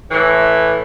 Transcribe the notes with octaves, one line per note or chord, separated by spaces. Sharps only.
A2 E3